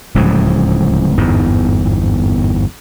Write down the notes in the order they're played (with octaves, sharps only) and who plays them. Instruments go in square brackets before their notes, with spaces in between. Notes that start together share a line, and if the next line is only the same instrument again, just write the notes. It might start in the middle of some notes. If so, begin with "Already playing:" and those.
[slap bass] D1 C#2 A2 F3
G1 E2 G#2